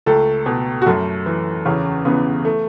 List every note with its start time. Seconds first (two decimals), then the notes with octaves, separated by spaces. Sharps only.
0.06 C#2 A3 A4
0.46 B2
0.82 F#4
0.86 F#2 A3 A4
1.26 E3
1.65 E2 C#3 C#4
2.05 C#3 E3 B3
2.45 A3